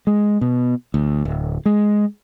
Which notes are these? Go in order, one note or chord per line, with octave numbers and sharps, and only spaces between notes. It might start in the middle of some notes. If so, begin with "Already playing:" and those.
G#3
B2
D2
D1
G#3